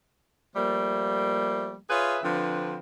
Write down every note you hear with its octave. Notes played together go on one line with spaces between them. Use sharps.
F3 G3 A3 A#3
F4 G#4 B4 C#5 E5
D3 F3 C4 D4 B4